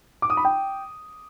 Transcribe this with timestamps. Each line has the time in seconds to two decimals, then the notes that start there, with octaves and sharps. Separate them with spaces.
0.22 D6
0.30 D#6
0.37 B5
0.45 G5